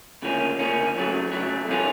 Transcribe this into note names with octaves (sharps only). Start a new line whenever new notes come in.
D2 C#3 F3 A#3 C#4
D2 C#3 F3 A#3 C#4
F2 C#3 F#3 A3
F2 C#3 F#3 A3
C3 D#3 G#3 C#4 F4